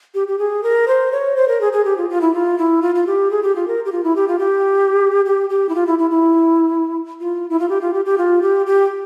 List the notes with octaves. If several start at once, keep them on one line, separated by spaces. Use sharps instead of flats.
G4
G4
G#4
A#4
C5
C#5
C5
A#4
G#4
G#4
G4
F4
F4
E4
F4
E4
F4
F4
G4
G#4
G4
F4
A#4
G4
F4
E4
G4
F4
G4
G4
G4
E4
F4
E4
E4
E4
F4
E4
F4
G4
F4
G4
G4
F4
G4
G4